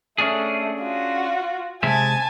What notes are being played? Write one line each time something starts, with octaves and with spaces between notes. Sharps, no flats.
A3 C#4 D4 G#4
F4 F#4
C3 G#3 E5 G#5 A5